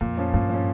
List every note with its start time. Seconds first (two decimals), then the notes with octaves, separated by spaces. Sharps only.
0.01 F2 A#2
0.17 F3 C#4
0.34 G2 A#2
0.49 F3 C#4